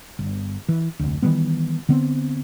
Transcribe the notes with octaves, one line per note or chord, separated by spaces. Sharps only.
G1
E3
F1 D2
D#3 E3 G3 B3
D3 B3 C4